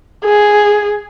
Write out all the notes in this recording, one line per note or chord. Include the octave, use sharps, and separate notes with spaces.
G#4